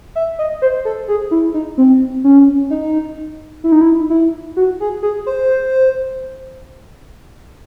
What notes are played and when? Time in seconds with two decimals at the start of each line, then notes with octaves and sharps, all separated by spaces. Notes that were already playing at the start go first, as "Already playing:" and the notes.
0.15 E5
0.39 D#5
0.62 C5
0.85 A4
1.08 G#4
1.31 E4
1.54 D#4
1.78 C4
2.24 C#4
2.70 D#4
3.64 E4
3.72 D#4
3.81 E4
4.10 E4
4.57 F#4
4.80 G#4
5.03 G#4
5.26 C5